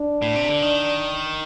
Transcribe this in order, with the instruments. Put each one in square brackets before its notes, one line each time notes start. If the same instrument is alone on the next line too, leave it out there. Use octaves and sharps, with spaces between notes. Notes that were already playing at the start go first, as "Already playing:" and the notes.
Already playing: [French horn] D4
[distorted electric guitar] A2
C3
D3
D#3